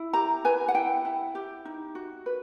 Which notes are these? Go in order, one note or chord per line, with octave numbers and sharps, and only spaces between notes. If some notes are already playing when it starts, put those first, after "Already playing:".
Already playing: E4
G4 A#5
B4 G#5
F#5
E4 G5
E4
G4
D#4
F#4
B4